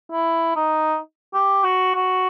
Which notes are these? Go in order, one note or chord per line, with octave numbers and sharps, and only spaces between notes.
E4
D#4
G4
F#4
F#4